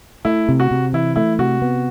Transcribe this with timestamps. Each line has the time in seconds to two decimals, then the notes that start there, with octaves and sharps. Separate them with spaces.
0.25 A3 E4
0.49 C3
0.60 F#4
0.71 C3
0.93 E3 E4
1.16 A3 E4
1.39 C3 F#4
1.62 B3